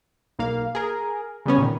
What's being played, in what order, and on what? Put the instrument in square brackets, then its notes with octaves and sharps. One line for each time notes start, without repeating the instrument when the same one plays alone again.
[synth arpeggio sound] B1 A#3 F5
G#4 A#4
C#3 G3 B3 C#4
A#2 D#3